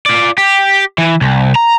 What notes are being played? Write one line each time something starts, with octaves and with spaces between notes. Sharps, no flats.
F4 D5
G4
E3
C2
A#5